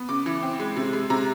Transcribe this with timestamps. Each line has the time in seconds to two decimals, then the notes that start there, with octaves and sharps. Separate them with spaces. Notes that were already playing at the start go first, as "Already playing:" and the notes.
Already playing: B3
0.09 C#3 D6
0.26 E3
0.42 C4
0.60 G#3
0.77 C3
0.93 G#3
1.10 C3 A#5